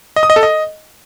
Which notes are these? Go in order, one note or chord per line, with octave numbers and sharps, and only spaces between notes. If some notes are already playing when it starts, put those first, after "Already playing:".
D#5
D#6
D#5
A4
D#5